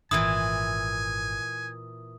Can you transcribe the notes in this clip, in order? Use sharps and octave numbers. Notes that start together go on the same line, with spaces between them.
G#1 A#2 E3 E4 G#5 D#6